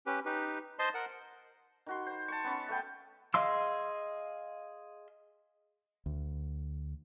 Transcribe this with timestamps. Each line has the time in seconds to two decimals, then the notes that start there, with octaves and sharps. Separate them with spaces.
0.06 C#4 G4 B4
0.26 D#4 G4 B4
0.79 C5 D#5 A5 C6
0.94 A#4 F#5
1.86 D#3 F#4 C6
2.07 C5
2.28 A5 C6 C#6
2.44 B3 C#4
2.68 A3 B3 G5
3.34 G#4 D#5 F5 C6 E6
6.06 D2